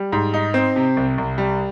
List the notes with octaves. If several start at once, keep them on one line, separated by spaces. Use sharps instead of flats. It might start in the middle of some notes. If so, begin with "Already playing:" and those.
Already playing: G3
G#2
D#4
C4
C3
C2
C2
G3